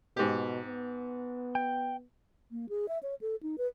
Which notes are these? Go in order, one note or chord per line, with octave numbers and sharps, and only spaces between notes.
G#2 B2 G4
B3
G5
A#3
G#4
E5
C#5
A4
D#4
B4